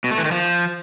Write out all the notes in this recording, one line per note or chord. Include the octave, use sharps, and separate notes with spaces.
B2
A3
E3
D#3
F3